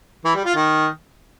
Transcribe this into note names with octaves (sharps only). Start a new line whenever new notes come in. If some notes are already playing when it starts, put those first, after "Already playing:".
E3
G3
F4
D#3